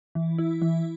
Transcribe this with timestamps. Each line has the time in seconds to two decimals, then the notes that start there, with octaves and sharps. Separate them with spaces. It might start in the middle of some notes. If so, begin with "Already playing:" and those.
0.15 E3
0.38 E4
0.62 E3